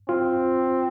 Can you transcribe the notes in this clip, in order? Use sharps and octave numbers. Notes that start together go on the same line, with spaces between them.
C4 F4